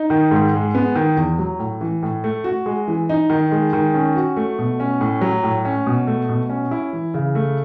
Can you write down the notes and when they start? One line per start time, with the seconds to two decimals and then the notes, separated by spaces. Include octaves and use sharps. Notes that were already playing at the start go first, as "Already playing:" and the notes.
Already playing: D#4
0.10 D#3
0.31 G#2
0.54 G#3
0.75 B3
0.96 D#3
1.17 E2
1.39 F#3
1.59 A2
1.81 E3
2.03 A2
2.24 A3
2.44 F#4
2.66 G#3
2.88 E3
3.09 D#4
3.30 D#3
3.52 G#3
3.73 D#3
3.94 C#4
4.16 F#4
4.37 A3
4.59 B2
4.80 C#4
5.01 A2
5.21 F#3
5.43 A2
5.65 C#4
5.87 B2
6.07 A3
6.29 B2
6.50 C#4
6.71 E4
6.93 E3
7.14 C#3
7.35 A3